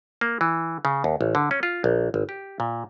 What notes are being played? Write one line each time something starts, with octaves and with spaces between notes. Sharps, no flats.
A#3
E3
C#3
D#2
A1
D3
C#4
F4
A#1
G#1
G4
A#2